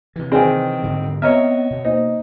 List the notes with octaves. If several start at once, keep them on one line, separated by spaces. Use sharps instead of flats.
C3 E3
D#3 C4 G#4 D5 G#5
G#2 D3 G3
B3 C4 C#5 D#5 E5 A#5 F6
B2
A#3 D#4 C5